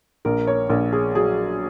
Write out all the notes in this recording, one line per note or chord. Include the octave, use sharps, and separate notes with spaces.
A#1 A#4
C#5
A#1
G#4
F#3 G#4